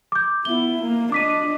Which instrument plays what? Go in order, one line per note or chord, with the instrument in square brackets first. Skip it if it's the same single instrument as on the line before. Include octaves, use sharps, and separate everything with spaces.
[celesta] D6 G6
[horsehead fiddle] B3 E4 [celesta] G7
[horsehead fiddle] A#3
[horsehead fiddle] D4 D#5 [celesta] D6 B6 D#7